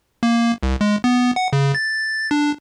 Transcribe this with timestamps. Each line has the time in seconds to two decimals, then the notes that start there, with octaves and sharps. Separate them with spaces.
0.23 A#3
0.63 C2
0.81 G#3
1.04 B3
1.36 F#5
1.53 C#3
1.75 A6
2.31 D4